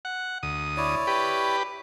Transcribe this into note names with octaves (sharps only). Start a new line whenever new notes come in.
F#5
D2 D#6
E4 C#5 D5
G4 B4